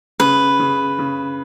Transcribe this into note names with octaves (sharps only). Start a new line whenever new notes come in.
C#3 B4
C#3
C#3